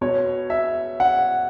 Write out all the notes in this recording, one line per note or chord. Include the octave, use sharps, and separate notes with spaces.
B2 C#5
E5
F#5